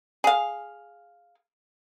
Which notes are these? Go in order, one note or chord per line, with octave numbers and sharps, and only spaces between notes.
G#4 F5